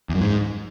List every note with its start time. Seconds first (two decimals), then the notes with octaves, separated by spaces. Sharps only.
0.09 E2
0.15 F#2
0.21 G#2